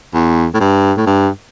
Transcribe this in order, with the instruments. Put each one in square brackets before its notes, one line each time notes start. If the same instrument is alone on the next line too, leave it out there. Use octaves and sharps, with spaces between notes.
[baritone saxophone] E2
A2
G2
A2
G2